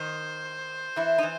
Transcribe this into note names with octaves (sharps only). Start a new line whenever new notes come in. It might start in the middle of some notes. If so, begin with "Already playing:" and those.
Already playing: D#3 D#4 C5
E3 E4
D#4
E3